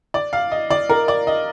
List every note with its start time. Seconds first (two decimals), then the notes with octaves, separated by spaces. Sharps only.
0.14 D5
0.33 F5
0.51 D#5
0.70 D5
0.89 A#4
1.08 D5
1.27 D#5